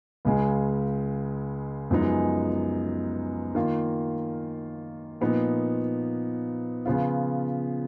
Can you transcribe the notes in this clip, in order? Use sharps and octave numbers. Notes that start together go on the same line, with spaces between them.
C#2 C#3 G#3
F#2 F3 G#3 B3 D#4
D#3 A#3 F4
A#2 F3 B3 D#4
C#3 F3 B3 F4